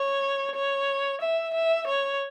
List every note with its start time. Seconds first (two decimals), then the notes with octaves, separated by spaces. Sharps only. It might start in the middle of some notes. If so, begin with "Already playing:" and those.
Already playing: C#5
0.55 C#5
1.22 E5
1.54 E5
1.87 C#5